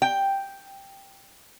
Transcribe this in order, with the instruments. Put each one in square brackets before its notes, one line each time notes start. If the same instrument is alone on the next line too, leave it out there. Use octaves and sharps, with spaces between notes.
[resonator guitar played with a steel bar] G5